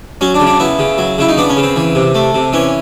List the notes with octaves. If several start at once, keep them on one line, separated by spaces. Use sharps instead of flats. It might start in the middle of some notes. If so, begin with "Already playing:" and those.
F#3 C#4
D4
C#3
D4
B3 E4
C#3
F#3
C#3 E4
D#4
B3 D4
C#4
C#3
C4
E3
C3
A3
C3
E3 C#4